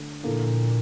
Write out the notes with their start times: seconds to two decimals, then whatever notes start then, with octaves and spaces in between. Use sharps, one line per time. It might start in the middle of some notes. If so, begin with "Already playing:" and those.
Already playing: D3 A3
0.23 A#2 D3 F3 A#3 E4 A4